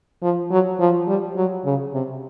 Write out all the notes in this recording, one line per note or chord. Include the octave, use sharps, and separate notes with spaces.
F3
F#3
F3
G3
F#3
C#3
C3